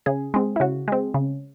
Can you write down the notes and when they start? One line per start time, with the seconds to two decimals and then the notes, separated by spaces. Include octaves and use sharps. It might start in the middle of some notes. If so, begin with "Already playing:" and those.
0.06 C#3 G#4
0.34 G#3 C4
0.56 E4
0.60 C#3 F#4
0.88 G#3 C4
1.14 C#3